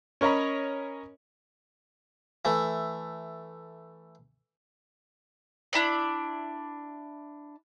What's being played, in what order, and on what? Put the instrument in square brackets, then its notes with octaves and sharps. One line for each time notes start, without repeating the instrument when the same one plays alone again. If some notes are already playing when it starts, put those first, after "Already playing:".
[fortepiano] C#4 A#4 C#5 D#5 A#5 B5
[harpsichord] E3 A3
[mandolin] D4 E4 G4 D5